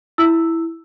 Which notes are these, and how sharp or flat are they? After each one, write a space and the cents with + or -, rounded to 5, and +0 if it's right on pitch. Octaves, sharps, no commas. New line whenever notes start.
E4 +0 E6 +0